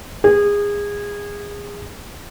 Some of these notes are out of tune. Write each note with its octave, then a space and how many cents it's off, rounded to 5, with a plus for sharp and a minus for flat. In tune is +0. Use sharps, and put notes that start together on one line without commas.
G#4 -25